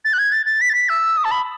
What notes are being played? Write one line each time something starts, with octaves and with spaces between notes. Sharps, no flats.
A6
F#6
G#6
A6
A6
B6
A6
B6
E6
D#6
A5
B5